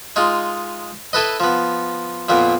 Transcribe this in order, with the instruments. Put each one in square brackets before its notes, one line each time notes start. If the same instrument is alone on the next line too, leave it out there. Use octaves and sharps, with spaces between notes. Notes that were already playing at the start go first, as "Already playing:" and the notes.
[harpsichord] G#3 D#4 F4
E4 A4 B4 D#5
F3 B3
F2 A#2 A#3 B3